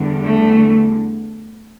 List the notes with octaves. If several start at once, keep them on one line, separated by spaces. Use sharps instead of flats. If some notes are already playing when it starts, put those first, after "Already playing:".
Already playing: E2 D3 G3
A3